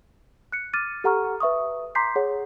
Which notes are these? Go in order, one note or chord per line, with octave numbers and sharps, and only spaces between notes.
F#6 C#7
D6 F6 A6 D#7
G4 A4 F#5 A#5 C#6 F6
B4 E5 C#6 D#6
A#5 C6 D6 G6 B6 C7
G#4 C#5 F#5